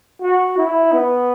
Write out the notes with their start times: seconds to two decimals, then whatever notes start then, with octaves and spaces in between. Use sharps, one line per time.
0.22 F#4
0.58 E4
0.93 B3